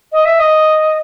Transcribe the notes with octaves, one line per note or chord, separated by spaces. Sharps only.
D#5
E5
D#5